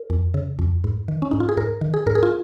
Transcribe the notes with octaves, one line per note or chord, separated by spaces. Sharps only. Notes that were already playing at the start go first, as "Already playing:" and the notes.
Already playing: A#4
F2
C#3
F2
G#2
D#3
C#4
G#2 D#4
F4
G#4
G#2 A#4
D#3
G#4
G#2 A#4
G#4
F4